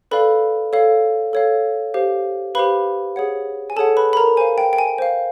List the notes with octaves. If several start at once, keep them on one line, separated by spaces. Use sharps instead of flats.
A4 B4 D5 F5 B5
A4 C#5 F5
A4 C#5 F5
G4 C5 F5
G4 B4 C5 F5 B5
G#4 C#5 F#5
G#5
G#4 A4 C#5 F#5 A5
B4 B5
B5
A#4 A#5
C5 F5 G#5
G5
G5
G#5
C5 F5